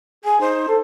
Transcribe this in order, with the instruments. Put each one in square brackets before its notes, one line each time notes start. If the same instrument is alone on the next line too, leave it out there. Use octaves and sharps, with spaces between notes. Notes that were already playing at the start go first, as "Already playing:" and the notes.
[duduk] G#4 [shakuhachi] G#5
[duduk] D#4 [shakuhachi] C5
[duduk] A4